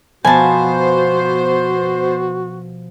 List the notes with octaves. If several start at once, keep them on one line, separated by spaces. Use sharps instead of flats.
B2 F3 B3 F#4 C5 G#5 A5 B5